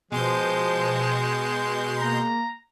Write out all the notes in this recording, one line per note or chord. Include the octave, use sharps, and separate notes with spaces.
B2 F3 G#3 C6 G6
A#3 A#5